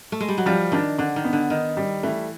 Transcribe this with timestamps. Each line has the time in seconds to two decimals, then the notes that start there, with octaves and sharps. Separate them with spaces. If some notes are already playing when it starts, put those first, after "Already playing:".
0.12 A3
0.20 G#3
0.29 G3
0.38 F#3
0.46 F3 G3
0.72 D#3 D4
0.98 D3 D4
1.16 D#3
1.24 B3
1.33 D3
1.50 D#3 D#4
1.77 G3
2.03 E3 A3